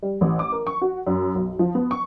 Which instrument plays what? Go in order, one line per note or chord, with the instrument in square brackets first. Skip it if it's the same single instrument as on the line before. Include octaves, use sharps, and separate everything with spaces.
[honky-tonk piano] G3
A1
D6
A#4
C#6
F#4
F#2
B1
F3
B3
C#6